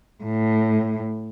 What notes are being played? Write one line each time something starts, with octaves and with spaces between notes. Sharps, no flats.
A2